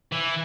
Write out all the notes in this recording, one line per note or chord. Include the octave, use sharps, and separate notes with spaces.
E3